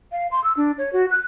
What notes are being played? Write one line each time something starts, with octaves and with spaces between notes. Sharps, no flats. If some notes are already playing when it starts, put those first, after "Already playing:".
F5
C6
E6
D4
C#5
F#4
F#6